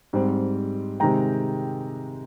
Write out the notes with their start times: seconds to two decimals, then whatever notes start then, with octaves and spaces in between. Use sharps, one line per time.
0.13 G#2 G3 C4
1.00 C3 D#3 G#3 G5 A#5